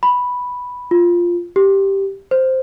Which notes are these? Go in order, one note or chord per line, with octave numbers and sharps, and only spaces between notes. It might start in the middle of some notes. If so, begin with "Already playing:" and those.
B5
F4
G4
C5